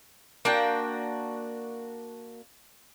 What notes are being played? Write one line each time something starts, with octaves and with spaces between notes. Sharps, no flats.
A#3 D4 F#4 G5